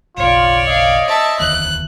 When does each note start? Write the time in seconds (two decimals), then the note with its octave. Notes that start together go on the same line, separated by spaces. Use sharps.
0.17 F#1 B1 F4 C#5 D5
0.68 D#5 F5
1.07 E5 A5
1.40 E1 D2 D#3 F#6